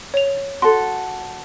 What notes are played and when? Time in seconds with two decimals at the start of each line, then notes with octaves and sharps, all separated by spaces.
0.14 C#5 F7
0.62 F#4 A4 C6